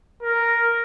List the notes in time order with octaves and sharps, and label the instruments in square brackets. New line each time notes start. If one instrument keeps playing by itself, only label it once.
[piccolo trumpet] A#4